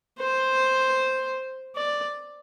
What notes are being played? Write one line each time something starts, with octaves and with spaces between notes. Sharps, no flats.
C5
D5